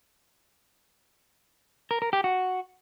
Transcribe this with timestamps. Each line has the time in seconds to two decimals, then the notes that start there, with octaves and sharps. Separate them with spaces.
1.91 A#4
2.02 A#4
2.13 G4
2.24 F#4